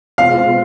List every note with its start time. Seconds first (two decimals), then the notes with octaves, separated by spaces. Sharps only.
0.18 B2 G#3 C4 F4 F5